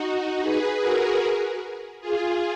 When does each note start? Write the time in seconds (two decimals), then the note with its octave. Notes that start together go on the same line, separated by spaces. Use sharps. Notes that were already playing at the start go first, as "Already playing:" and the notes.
Already playing: D#4 F#4
0.41 G#4 B4
0.80 F#4 A#4
2.01 F4 G#4